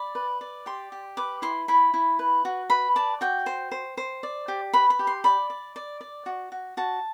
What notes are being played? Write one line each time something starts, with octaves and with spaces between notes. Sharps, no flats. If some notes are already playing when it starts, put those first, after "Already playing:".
Already playing: D5 B5
B4
D5
G4 C6
G4
B4 D6
E4 C6
E4 B5
E4
B4
F#4
B4 B5
D5 A5
F#4 G5
C5
C5
C5
D5
G4
B4 B5
B5
G4
C6
D5 B5
D5
D5
D5
F#4
F#4
F#4 A5